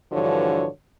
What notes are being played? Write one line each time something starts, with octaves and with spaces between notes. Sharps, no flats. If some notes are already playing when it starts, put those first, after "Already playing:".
G2 D3 E3 F3 F#4 C#5